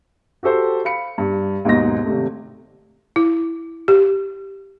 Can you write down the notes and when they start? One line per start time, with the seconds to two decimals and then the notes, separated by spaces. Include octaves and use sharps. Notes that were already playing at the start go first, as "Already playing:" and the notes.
0.43 F#4 G4 A4 C5
0.85 F5 B5 C#7
1.18 G2
1.65 D#2 G#2 B2 D#4 A#6
2.06 G#1 C3 A3
3.16 E4
3.88 G4